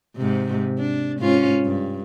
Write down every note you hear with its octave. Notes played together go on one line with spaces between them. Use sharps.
G#2 C3
D4
G#2 C#4 F4
G2